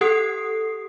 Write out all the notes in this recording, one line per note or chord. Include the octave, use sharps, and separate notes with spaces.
G4 A4 F#5 D#6 C7